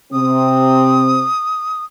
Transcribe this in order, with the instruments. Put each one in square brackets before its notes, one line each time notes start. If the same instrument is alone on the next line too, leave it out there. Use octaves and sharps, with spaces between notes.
[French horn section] C3 C4 [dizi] D#6